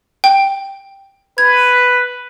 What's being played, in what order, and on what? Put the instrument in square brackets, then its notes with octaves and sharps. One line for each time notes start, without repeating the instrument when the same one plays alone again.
[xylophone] G5
[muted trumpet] B4 [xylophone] G#6